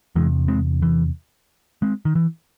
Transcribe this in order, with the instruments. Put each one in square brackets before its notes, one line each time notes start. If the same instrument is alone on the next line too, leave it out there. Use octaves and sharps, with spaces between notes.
[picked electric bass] E2 C3 E3 G#3
G#3 C4
E3
G#3 C4
D#3
E3